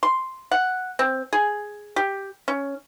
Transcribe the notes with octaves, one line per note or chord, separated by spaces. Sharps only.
C6
F#5
C4
G#4
G4
C#4